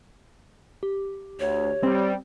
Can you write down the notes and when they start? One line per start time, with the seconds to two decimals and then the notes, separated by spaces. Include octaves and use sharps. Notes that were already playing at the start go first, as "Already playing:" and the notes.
0.83 G4
1.40 D2 C#5
1.83 G3 C4